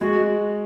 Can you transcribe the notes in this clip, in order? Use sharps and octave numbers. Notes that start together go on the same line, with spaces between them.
G#3 F#4